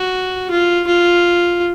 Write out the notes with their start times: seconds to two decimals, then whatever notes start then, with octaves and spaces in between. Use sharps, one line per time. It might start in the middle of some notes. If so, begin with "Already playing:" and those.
Already playing: F#4
0.51 F4
0.87 F4